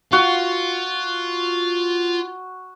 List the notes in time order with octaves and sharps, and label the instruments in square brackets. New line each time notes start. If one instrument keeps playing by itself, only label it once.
[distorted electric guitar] F4 [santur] F#4